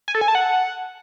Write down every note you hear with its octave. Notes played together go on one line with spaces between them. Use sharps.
G#5
A4
G#5
A5
F#5